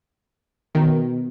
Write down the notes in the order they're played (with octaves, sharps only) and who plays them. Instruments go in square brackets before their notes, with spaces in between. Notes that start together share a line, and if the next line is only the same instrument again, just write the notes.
[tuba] B2 [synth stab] D#3